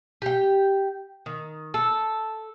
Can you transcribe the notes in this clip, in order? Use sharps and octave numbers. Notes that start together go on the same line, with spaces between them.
G4 G5
D#3
A4